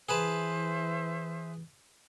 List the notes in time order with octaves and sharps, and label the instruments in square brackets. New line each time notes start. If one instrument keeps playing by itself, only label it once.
[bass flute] E3 [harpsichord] G#4 B4 A5 [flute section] C5 E5